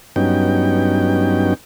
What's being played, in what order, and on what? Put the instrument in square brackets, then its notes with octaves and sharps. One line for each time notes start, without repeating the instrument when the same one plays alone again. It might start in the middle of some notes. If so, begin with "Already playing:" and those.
[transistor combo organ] G2 F#3 B3 C#4 D#4 G5